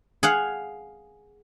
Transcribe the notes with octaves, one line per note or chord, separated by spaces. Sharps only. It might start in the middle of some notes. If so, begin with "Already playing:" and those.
G#4 F5 F#5